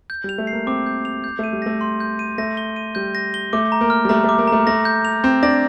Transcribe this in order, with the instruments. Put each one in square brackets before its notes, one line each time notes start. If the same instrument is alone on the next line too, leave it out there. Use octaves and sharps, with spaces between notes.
[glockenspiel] G6
[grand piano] G3 [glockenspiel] F7
[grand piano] A3
[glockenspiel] C7
[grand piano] A#3
[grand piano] C4 [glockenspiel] D6
[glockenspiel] G6
F7
G6
[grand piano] A3 [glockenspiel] D#7
[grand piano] G3
[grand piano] A3 [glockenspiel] A#6
[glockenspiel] C6
G6
D#7
[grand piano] A3 [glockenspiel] A#6
[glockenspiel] G7
D#7
[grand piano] G3 [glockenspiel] G6
[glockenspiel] A#6
G7
[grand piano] A3 [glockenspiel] D6
[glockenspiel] A#5
[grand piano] A#3
[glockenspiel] F6
[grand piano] G3
[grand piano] A3 [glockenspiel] A#5
[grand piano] A3 [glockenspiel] D6
[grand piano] A#3
[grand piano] A3 [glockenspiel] A#5
[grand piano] A3 [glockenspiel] A#6
[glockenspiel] G6
F7
[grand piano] C4 [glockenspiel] G6
[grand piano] D4 [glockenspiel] A#6